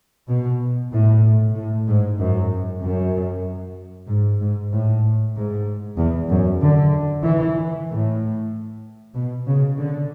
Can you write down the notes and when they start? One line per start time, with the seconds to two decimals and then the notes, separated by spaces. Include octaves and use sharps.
0.28 B2
0.92 A2
1.54 A2
1.87 G#2
2.18 F#2
2.81 F#2
4.08 G#2
4.40 G#2
4.72 A2
5.35 G#2
5.97 E2
6.29 F#2
6.61 D3
7.24 E3
7.88 A2
9.14 B2
9.46 C#3
9.77 D3